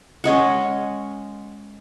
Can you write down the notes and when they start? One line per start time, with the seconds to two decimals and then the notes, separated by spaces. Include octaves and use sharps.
0.24 G#3 C#4 D#5 F#5